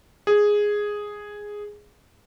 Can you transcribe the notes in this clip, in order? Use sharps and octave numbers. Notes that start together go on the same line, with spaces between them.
G#4